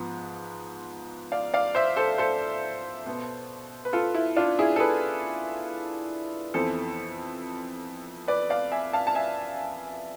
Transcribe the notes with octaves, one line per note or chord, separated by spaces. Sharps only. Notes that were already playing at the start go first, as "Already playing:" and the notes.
Already playing: G#2 F3 B3
D5 F5
D5 F5
C5 E5
A4 C5
A4 C5
B2 B3
B4
F4 A4
E4
D4 F4
E4 G#4
A4
G#4 B4
F2 E3 B3 A4 C5
B4 D5
D5 F5
E5 G#5
F5 A5
A5
E5 G#5